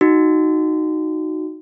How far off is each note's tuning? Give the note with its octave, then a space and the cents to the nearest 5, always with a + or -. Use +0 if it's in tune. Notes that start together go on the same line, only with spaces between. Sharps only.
D#4 +0 F#4 +0